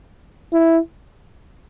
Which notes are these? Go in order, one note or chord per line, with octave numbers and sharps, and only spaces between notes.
E4